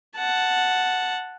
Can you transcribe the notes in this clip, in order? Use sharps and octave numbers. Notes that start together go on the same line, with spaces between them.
F#5 A5